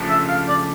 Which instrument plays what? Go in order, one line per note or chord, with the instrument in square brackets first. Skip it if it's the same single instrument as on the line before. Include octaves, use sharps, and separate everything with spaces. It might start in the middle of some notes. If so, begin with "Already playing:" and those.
Already playing: [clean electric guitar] C#3 F3 A3 D4 G4
[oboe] E5
F5
D5